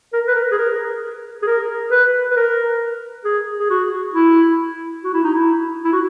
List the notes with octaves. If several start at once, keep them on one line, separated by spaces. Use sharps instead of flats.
A#4
B4
A#4
G#4
A#4
G#4
A#4
B4
B4
A#4
G#4
G#4
F#4
E4
F#4
E4
D#4
E4
E4
F#4